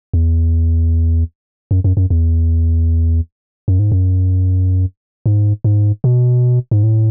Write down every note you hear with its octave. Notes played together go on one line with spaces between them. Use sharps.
E2
F#2
F#2
F#2
E2
F#2
G#2
F#2
G#2
G#2
B2
G#2
A2